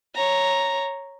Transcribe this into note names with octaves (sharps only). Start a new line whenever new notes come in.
C#5 A#5